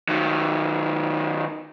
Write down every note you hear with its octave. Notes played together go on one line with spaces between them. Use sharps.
D#3 F#3